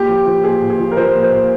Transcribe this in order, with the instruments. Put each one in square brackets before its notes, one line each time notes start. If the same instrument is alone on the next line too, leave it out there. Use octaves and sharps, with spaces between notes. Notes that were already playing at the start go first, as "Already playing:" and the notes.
Already playing: [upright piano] A#2 G4
F3
F3
A#2 G#4
A#2
G#4
F3
A#4
F3 C5
A#2
C5
A#2